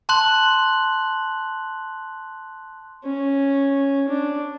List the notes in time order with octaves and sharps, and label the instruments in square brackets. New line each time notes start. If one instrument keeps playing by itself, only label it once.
[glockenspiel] A5 C6 F#6 F#7
[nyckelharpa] C#4
D4